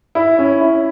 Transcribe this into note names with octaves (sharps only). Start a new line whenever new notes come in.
E4
C#4
E4